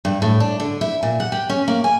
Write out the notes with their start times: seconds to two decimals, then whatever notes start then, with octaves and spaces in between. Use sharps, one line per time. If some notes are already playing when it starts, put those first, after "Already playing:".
0.05 G2
0.22 A2
0.40 D4
0.60 D3
0.81 E4
1.03 A#2
1.20 F#5
1.32 G4
1.50 C#4
1.68 A#3
1.84 G#5